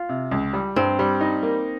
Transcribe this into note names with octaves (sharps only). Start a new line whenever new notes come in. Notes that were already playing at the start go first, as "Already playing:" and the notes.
Already playing: F4
C3
C#2
G3
G2 C4
G3
D#4
A#3